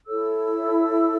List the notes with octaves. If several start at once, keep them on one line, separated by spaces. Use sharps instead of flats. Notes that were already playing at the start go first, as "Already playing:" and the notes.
E4 A4 C#5 E6